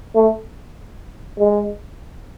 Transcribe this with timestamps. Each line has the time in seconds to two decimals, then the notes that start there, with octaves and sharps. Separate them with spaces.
0.15 A3
1.39 G#3